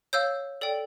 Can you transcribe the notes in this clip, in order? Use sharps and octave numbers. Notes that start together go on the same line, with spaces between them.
C#5 F5 E6 G6
A4 D5 G5